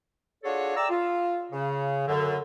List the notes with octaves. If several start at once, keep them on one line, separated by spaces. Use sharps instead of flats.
D4 F4 F#4 G#4 A4 C#5
D5 E5 G5 A#5 E6
F4
C#3
F#2 D3